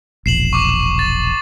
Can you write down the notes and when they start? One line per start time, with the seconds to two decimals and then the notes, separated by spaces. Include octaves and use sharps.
0.26 E1 A#1 C7 E7 F#7
0.53 C#6 D6
0.99 A6